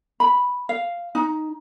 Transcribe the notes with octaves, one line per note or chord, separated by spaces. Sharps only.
B5
F5
D#4